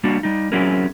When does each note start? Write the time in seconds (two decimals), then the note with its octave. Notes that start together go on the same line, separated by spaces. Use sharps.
0.04 G3 A#3 D4 F#4
0.23 G3 D#4
0.52 F#3 C4 C#4 E4 G#4 A#4